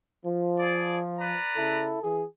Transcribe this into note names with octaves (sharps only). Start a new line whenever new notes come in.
F3
G#4 D5
B4 D5 A#5
C#3 E4 A4
E3 G#4